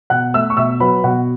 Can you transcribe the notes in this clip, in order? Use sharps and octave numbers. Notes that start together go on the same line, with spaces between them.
B2 F#5 F#6
A3 E5 E6
C#6
B2 E5 E6
F#3 B4 B5
B2 F#4 F#5